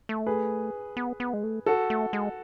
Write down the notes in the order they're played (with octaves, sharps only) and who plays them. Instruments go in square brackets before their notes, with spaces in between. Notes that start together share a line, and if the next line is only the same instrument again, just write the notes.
[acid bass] A3
[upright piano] G#4 B4
[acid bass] B3
B3
G#3
A3
[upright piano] F#4 A4
[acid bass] A3
G#3